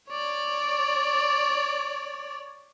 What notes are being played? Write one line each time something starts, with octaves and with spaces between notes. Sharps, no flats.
C#5 D5